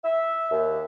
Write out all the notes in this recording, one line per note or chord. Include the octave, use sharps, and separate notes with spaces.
E5
D#2